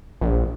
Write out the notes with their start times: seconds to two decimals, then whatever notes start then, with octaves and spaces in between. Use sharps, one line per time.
0.21 A#1